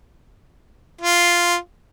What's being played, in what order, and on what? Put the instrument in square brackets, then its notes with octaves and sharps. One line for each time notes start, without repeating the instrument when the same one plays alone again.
[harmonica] F4